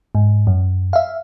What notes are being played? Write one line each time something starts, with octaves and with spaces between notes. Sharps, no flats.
G#2
F#2
E5 F5